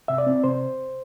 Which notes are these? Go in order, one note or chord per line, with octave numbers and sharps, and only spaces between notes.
C3 E5
D5
C4
C3 C5